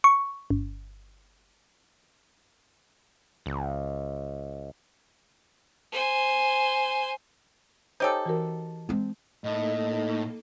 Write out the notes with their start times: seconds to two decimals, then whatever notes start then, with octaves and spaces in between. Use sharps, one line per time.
0.04 C#6
0.50 G1
3.46 C#2
5.92 C5 G#5
8.00 D#4 G4 A4 C5 C#5 G#5
8.26 E3 F#4 A#4
8.89 G#3 C4
9.44 A2 A#3 D#4 A4 D#5